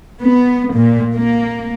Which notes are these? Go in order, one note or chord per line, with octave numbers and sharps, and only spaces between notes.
B3
A#2
A#3